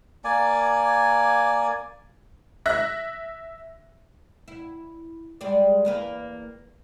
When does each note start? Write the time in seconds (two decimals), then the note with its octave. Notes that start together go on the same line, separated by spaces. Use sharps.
0.24 A#3 D5 G#5
2.66 E5 F#6 A#6
4.48 E4
5.41 G3 G#3 D5
5.85 E2 A#3 B4